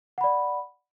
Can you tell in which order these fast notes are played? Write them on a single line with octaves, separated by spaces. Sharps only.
F#5 B5 D5